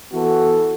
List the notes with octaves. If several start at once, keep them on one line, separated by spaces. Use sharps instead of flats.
E3 B3 F#4 A4